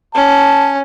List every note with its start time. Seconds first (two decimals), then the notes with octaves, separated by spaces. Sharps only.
0.15 C#4 A5